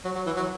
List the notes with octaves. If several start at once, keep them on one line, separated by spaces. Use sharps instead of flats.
F#3
F#3
E3
F#3